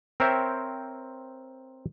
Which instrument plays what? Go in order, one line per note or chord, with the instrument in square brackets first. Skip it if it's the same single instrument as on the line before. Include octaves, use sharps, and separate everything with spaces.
[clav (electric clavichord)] C4 A#4 C5 C#5 E5 G5